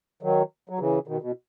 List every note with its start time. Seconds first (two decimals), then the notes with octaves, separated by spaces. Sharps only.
0.23 D#3 F#3
0.69 F#3
0.79 C#3 E3
1.07 B2 D#3
1.22 B2